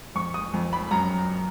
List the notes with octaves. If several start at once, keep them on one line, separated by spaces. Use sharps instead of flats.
F2 C#6
D#6
F2
B5
F#2 A#5